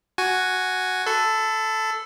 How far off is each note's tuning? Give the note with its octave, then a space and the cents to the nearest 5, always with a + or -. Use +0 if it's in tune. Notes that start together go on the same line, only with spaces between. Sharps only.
F#4 +0 G#5 +5
A4 +0 B5 +45